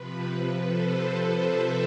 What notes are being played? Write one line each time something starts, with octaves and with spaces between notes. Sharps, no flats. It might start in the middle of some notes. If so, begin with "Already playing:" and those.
Already playing: C3 F3 B4
A4 C5
C5 E5